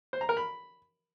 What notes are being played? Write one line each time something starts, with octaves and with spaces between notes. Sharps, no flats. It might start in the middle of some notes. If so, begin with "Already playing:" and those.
C5
A#5
A#4
B5